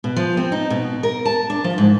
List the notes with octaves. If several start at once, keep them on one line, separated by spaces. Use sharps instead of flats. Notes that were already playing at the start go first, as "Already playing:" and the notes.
B2
F3
C4
D#4
B2
A#4
A5
D4
F3
G#2